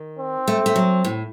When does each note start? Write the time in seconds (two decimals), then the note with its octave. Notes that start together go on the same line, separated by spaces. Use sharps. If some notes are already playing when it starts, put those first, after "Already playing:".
Already playing: D#3
0.19 C4
0.48 A3
0.66 A3
0.76 F#3
1.05 A2